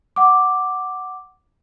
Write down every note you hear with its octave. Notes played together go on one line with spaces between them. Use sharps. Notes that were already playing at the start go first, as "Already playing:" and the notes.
F#5 D6